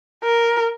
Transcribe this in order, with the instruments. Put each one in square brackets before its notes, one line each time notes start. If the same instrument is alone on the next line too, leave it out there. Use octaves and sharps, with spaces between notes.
[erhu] A#4